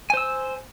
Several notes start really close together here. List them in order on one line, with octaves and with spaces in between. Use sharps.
G#5 C5 E6